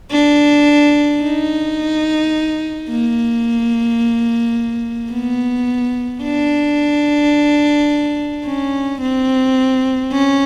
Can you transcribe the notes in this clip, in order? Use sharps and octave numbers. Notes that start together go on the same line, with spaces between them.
D4
D#4
A#3
B3
D4
C#4
C4
C#4